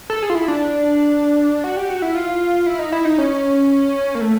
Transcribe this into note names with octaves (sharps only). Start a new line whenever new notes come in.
A4
G#4
F4
E4
D4
F#4
G4
F#4
E4
F4
E4
D#4
E4
D#4
C#4
A#3
A3